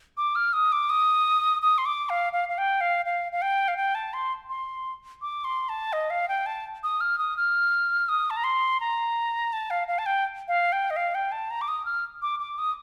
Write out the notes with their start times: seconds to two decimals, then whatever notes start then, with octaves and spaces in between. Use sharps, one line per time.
0.17 D6
0.35 F6
0.53 D#6
0.72 D6
0.90 D#6
1.62 D#6
1.78 C6
1.86 D6
2.09 F5
2.33 F5
2.49 F5
2.58 G5
2.81 F5
3.06 F5
3.32 F5
3.42 G5
3.68 F5
3.77 G5
3.95 A5
4.14 C6
4.50 C6
5.22 D6
5.44 C6
5.69 A5
5.93 D#5
6.10 F5
6.28 G5
6.46 A5
6.83 D#6
7.01 F6
7.18 D#6
7.37 F6
8.09 D#6
8.30 A5
8.37 A#5
8.44 C6
8.80 A#5
9.53 A5
9.70 F5
9.88 F5
9.99 A5
10.06 G5
10.48 F5
10.72 G5
10.90 D#5
10.96 F5
11.15 G5
11.32 A5
11.50 A#5
11.61 D6
11.68 D#6
11.85 F6
12.22 D6
12.40 D6
12.59 D#6